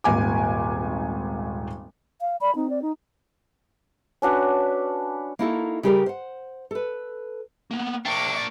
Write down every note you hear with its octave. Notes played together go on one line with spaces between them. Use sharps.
D#1 G#1 G#5 D6
F5
D5 B5
C4 D#4
D5
D#4
C#4 D4 F#4 B4
A#3 D#4 E4 F#4 A4
C#3 G3 G4 G#4 A#4
C5 F#5
A4 B4
A#3 B3
A#3 D4 E5 G5 C#6 D6